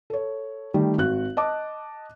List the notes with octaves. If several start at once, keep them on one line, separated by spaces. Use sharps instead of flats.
A4 C#5
D#3 G3 A3
G#1 F#4 F#6
D#5 A5 D6